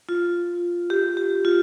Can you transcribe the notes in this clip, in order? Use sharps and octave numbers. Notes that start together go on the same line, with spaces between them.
F4
G4
G4
F4